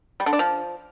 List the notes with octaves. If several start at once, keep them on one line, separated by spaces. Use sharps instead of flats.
G3
D3
D4
F3